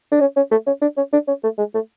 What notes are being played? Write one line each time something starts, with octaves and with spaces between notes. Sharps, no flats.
D4
C#4
C#4
A3
C#4
D4
C#4
D4
C#4
A3
G#3
A3